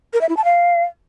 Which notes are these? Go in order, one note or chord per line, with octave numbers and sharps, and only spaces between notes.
A#4
E5
E4
A5
F5